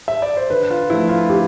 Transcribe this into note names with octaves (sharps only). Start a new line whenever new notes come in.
E5
D5
C5
D3 B4
F4
F3 A3 E4
F4
D3 G4